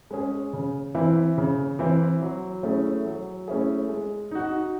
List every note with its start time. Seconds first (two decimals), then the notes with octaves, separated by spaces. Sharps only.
0.11 G#3 C#4 G#4
0.53 C#3
0.95 E3 C4 E4
1.38 C#3
1.79 E3 C4 E4
2.22 F#3
2.63 A3 C#4 E4 G#4
3.06 F#3
3.48 A3 C#4 E4 G#4
3.89 G#3
4.31 D#4 F#4